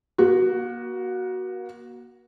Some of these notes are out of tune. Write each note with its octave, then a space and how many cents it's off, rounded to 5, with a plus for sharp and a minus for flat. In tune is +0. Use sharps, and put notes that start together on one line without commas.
A#3 +40 F#4 +5